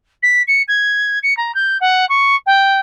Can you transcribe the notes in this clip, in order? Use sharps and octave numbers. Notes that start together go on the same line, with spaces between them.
B6
C#7
G#6
C#7
A#5
G6
F#5
C#6
G5